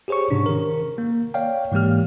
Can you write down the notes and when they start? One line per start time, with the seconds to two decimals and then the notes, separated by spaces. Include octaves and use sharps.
0.08 G4 G#4 C5 C#5 C#6
0.31 G#2 C3 C#4 D4
0.46 D#3 A#4
0.98 A#3
1.34 C#5 D5 F5 G5
1.72 G#2 E3 G#3 A#3 G4 F6